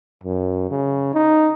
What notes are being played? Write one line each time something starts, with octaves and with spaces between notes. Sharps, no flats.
F#2
C#3
D#4